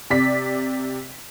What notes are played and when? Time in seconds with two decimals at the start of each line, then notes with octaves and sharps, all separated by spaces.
0.10 C3 D5 B6